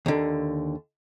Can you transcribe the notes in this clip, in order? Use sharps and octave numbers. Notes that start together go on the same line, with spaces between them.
D#2 D3